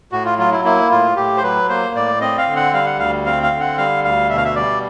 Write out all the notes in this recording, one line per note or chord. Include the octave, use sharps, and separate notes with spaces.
A2 F#4
F4
F#3 F4
E4
A#3 E4
A2 F4
A2 G4
C5
F#3 B4
A#3 C5
A2 D5
C4 D#5
F5
D3
F#5
G3 F5
F#5
D2 F5
C4 F5
F5
D3
F#5
G3 F5
D2 F5
B2 E5
F5
E5
G3 D5